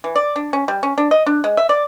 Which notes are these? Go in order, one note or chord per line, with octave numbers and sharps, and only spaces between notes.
E3
D5
D4
C#4
G3
C#4
D4
D#5
D4
G#3
E5
D5